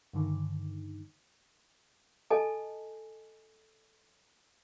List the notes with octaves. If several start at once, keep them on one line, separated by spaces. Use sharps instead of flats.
G2 D3 D#3
A4 D#5 G#5 A5